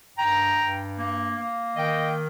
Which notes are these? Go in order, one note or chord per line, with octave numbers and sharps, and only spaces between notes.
G2 G5 A#5
G2
A#3
A#3
D#3 D#5 G5